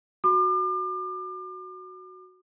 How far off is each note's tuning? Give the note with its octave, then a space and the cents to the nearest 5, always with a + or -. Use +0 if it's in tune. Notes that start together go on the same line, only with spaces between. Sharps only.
F#4 +0 D6 +40